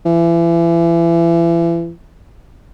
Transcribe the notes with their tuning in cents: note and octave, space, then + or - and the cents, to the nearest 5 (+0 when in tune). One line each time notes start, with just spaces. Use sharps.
E3 +35